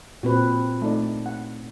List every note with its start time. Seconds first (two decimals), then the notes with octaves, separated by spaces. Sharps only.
0.23 A#2 C4 F#4 B4
0.82 A3 D#4 D5
1.26 F#5